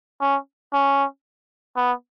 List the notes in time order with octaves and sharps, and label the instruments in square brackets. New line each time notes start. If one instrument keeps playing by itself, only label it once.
[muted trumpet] C#4
C#4
B3